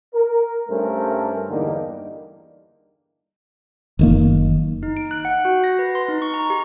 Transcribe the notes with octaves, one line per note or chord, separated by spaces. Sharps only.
A#4
G2 G3 A3 C#4 A#4 C5
E2 G2 D3 G3 A#3 D#4
F#1 D#3 A#3
D#4
D7
F#6
F#5
F#4
A#6
B4
C6
D#4
C#6
A#5
G4